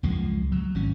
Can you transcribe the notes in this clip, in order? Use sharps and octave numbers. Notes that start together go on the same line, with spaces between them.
C#2 F#2 F3 G#3
F#3
G#1 F#3 C#4